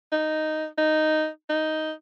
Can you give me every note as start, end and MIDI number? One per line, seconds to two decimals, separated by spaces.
0.12 0.66 63
0.78 1.28 63
1.49 1.92 63